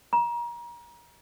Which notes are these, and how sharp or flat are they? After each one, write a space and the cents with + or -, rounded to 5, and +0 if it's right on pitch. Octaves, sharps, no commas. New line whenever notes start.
A#5 +30